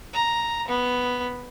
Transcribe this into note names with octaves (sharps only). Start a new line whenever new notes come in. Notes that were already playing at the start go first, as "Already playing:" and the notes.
A#5
B3